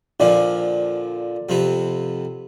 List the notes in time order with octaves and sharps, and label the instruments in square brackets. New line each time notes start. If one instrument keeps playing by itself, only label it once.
[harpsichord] A#2 D3 F3 [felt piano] D5
[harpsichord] F2 C3 B3